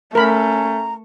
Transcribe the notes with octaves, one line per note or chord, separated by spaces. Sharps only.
A3 C#4 A#4 A#5 B5